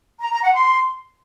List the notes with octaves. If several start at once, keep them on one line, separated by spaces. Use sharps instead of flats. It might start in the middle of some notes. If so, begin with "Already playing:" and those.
A#5
A#5
F#5
C6